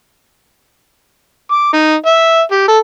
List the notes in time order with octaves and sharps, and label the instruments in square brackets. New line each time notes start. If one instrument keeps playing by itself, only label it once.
[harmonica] D6
D#4
E5
G4
A4